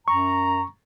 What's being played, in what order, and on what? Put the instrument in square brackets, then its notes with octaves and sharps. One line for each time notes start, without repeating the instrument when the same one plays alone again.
[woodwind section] F#2 A#5 [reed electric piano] C#6